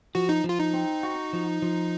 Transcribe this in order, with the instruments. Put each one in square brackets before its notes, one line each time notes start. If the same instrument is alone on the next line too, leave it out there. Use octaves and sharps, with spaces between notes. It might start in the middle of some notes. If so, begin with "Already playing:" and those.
[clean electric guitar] F3 [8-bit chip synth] F#4
[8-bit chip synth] D#4
[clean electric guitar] F3 [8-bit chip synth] F4
[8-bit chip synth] D#4
[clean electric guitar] C4
F#4
F3
F3